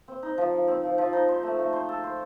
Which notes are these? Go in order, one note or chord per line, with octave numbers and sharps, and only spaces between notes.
C4
D#4
F3
F3
C4
F3
F3
D#4
C5
A3
A3
C5
A4
C5